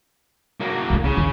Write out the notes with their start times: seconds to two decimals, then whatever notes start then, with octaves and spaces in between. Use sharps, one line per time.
0.60 F#3 A#3
0.90 C2 A3
1.04 C#3
1.17 D#2